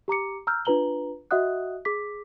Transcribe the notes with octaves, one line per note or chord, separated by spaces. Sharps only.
G4 A#5 D6 C#7
A#5 E6 F6 G6
D4 F4 B4 A#5 F#7 G7
F#4 D#5 E5 F#5 D#6 F#6
G#4 D6 B6